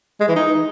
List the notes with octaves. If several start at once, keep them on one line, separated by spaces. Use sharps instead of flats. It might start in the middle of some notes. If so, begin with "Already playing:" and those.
G#3
E3
D#4